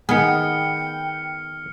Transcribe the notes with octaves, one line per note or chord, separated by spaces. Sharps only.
D#3 B3 G#4 G5 F6 C#7